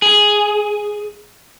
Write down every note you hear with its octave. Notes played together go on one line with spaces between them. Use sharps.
G#4